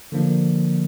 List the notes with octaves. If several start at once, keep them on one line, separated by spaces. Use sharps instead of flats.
D3 F3 A#3 D4